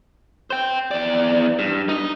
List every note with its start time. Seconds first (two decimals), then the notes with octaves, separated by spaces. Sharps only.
0.50 C5 G5
0.91 E2 D5
1.59 G2
1.89 D#4 D#5